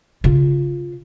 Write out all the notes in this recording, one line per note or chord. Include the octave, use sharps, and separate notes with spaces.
C#3 F4